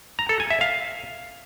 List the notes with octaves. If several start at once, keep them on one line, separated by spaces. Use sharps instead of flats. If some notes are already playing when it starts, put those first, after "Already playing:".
A#5
A4
G#5
E5
F5